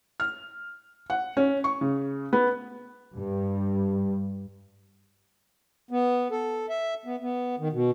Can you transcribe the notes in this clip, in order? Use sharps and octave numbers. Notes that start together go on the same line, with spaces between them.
F6
F#5
C#4
C#6
C#3
B3
G2
B3
A4
E5
B3
B3
D#3
B2